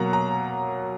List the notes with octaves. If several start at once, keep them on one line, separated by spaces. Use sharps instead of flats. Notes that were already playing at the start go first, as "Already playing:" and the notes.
Already playing: B2 F#3 A#3 F#5 A#5
A#5